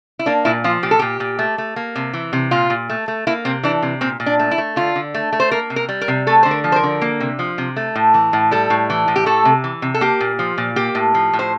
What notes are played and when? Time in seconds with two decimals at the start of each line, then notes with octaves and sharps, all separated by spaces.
0.19 E4
0.26 A#3 D4
0.45 A#2 E4
0.64 F3 F4
0.83 A#2 G4
0.91 A4
0.99 A#2 G4
1.20 A#2
1.39 A3
1.58 A3
1.76 A#3
1.96 C3
2.13 E3
2.33 C3
2.51 A#2 F4
2.70 A#2
2.90 A3
3.08 A3
3.27 A#3 E4
3.45 C3 C4
3.63 E3 D4
3.82 C3
4.01 A#2 C4
4.20 A#2
4.26 D4
4.39 A3
4.51 E4
4.58 A3
4.76 D3 F4
4.96 D3
5.14 A3
5.32 A3
5.40 C5
5.51 A#3 A#4
5.70 C3
5.76 A#4
5.89 G3
6.01 A#4
6.08 C3
6.27 A3 A4
6.43 D3 C5
6.51 A#4
6.64 F3
6.72 C5
6.76 A#4
6.83 D3
7.02 A#3
7.20 C3
7.39 F3
7.58 C3
7.76 A3
7.95 A2
8.14 E3
8.33 A2
8.51 G3 A4
8.70 A2
8.90 E3
9.08 A2
9.16 G4
9.26 A3 A4
9.45 C3
9.64 E3
9.82 C3
9.94 A4
10.01 A#3 G4
10.21 A#2
10.39 F3
10.58 A#2
10.76 A#3 G4
10.95 A2
11.14 F3
11.33 A2
11.39 C5